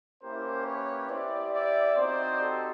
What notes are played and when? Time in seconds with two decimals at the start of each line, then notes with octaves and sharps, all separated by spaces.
0.22 A#3 C#4 E4 G4 A#4 C5
0.65 B4 C#5
1.09 B3 E4 G4 C5 D5
1.53 D5 E5
1.96 C4 D#4 F#4 C5 D5
2.39 G4 A4